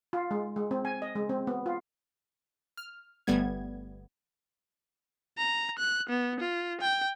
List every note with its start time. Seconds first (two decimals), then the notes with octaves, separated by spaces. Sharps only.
0.13 F4
0.31 G#3
0.56 G#3
0.71 C4
0.85 G#5
1.02 D#5
1.15 G#3
1.29 C4
1.47 B3
1.66 F4
2.77 F6
3.27 G1 G3 A3 B3 G#6
5.38 A#5
5.78 F#6
6.09 B3
6.40 F4
6.81 G5